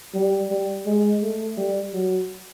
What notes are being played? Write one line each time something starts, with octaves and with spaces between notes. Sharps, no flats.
G3
G3
G#3
A3
G3
F#3